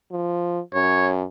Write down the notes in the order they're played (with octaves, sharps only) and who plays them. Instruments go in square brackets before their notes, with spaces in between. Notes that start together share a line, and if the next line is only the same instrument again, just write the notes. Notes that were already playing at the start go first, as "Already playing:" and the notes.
[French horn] F3
[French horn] F#2 [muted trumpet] C#5